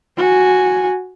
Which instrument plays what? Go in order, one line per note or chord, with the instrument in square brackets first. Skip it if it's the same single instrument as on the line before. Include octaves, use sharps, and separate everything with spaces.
[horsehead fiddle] F#4 G#5